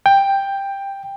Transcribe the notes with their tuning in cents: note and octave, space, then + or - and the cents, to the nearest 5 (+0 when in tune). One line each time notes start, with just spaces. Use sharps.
G5 +10